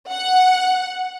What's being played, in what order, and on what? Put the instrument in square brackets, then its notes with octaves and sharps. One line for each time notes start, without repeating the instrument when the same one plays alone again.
[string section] F#5